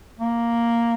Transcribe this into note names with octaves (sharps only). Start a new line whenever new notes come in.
A#3